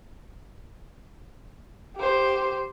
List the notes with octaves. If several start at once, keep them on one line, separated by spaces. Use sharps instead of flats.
G4 C5